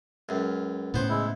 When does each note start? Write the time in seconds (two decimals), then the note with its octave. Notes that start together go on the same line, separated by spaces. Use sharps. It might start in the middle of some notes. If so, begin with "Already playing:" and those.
0.29 C#2 F#2
0.94 A2 C#3 B3 C5
1.09 G#3 E4